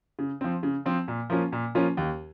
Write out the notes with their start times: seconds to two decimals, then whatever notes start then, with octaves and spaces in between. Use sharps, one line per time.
0.19 C#3
0.41 F3 C4
0.63 C#3
0.86 F3 C4
1.08 A#2
1.30 F3 A#3 C#4 F4
1.52 A#2
1.75 F3 A#3 C#4 F4
1.97 D#2